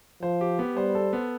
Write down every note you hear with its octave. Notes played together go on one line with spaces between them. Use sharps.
F3 C5
G4
B3
G3 C5
A4
B3